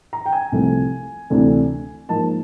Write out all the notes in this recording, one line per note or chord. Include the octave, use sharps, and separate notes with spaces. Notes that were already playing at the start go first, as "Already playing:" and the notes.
A#5
G5
G#5
C2 C3 F3 A3
D2 C3 E3 A3 D4
G#2 F3 A#3 D#4 A5